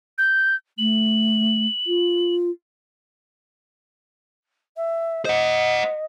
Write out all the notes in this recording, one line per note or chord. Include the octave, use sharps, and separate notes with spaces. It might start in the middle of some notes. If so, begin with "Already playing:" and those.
G6
A3 F#7
F4
E5
C5 D#5 F#5